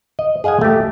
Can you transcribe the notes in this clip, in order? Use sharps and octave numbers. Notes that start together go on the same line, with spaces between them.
D#5
G#4 D#5 F5 F#5 G#5
A3 G4